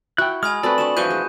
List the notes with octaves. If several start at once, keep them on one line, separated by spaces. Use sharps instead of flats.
E4 F#4 G5 F#6
G#3 G#5 B5 D#6 F6
A3 C4 F#4 A4 B4 D5
D4 F#4 A5 E7
G2 E3 F3 F#4 F#6 G6 D#7
G#3